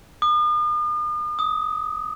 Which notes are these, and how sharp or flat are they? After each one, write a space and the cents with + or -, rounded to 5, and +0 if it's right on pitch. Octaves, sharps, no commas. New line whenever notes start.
D#6 -45
D#6 +20